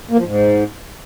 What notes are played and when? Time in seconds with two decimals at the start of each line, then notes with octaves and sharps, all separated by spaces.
0.11 A#3
0.18 F3
0.25 G#2